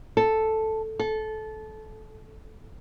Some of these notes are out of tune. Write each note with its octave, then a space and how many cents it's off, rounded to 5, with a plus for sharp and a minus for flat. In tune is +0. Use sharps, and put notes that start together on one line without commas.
A4 +0
A4 -20